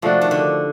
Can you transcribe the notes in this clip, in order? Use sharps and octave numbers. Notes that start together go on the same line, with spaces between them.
C3 F3 A3 D4 F#4
D#3
D3